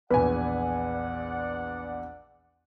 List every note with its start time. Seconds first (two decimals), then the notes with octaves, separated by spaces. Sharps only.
0.10 A#1 E2 B4 D5 F#5 G#5